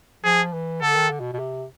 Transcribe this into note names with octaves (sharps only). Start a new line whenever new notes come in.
F3 G#4
E3
D3 A4
D#3
D3
B2
B2
C3